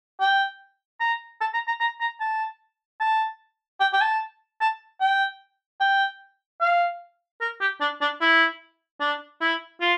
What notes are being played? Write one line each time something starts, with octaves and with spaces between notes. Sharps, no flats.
G5
A#5
A5
A#5
A#5
A#5
A#5
A5
A5
G5
G5
A5
A5
G5
G5
F5
A#4
G4
D4
D4
E4
D4
E4
F4